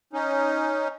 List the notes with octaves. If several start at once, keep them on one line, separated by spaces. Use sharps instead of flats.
C#4 D#4